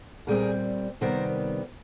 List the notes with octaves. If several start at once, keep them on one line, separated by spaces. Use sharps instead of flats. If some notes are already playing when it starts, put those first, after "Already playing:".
A#2 G3 C4 G#4 A#4
C3 D#3 G3 B3 A#4 C5